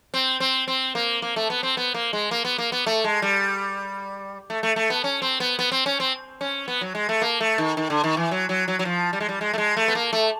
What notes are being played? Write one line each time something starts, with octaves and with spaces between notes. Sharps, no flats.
C4
C4
C4
A#3
A#3
A3
B3
C4
B3
A#3
G#3
A#3
B3
A#3
B3
A3
G#3
G3
A3
A3
A3
B3
C#4
C4
B3
B3
C4
C#4
C4
C#4
B3
F#3
G#3
A3
A#3
A3
D#3
D#3
D3
D#3
E3
F#3
F#3
F#3
F#3
F3
G3
G#3
G3
G#3
A3
G#3
A3
B3
A#3
A3